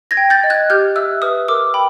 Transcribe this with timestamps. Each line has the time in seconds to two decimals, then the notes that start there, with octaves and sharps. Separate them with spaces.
0.11 G#6 A#6
0.17 G5
0.30 G6 A6
0.44 D#5
0.50 F#6 G#6
0.70 G4 F6 G6
0.96 E5 E6 F#6
1.22 B4 D#6 F6
1.48 A#4 D6 E6
1.74 G5 B5